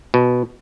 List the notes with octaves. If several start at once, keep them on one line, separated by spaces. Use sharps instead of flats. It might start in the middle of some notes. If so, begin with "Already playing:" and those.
B2